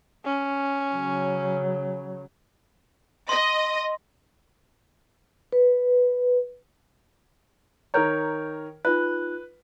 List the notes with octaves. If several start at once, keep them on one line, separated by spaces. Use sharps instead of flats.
C#4
C#3 F#3
D#5 C6
B4
D#3 A#4 C#5 A#5 G6
D#4 F4 B4 F#6